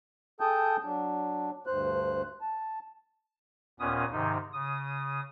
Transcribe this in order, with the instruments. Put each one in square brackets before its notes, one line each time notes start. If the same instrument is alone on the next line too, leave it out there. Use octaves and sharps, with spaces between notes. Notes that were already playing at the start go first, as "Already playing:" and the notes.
[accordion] G#4 A4 G5 A5 D#6 G6
F#3 D4
D2 G2 C5 F#6
A5
[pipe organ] D#2 A#2 B3 C#4 D#6
G#2 C3 D#3 D#4
C#3 D#6